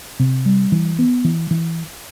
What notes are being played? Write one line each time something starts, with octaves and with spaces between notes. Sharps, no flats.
C3
G3
E3
B3
E3
E3